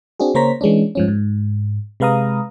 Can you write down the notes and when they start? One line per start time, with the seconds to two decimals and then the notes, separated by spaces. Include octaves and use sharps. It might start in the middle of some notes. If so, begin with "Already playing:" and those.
0.20 C4 D4 F#4 G#4
0.34 C#3 A#3 C5 C#5 A#5 B6
0.61 E3 G#3 C#4 D4
0.95 G#2 F3 C#4
1.08 G#2
2.00 C3 G#3 B4 F5 A#5 D#6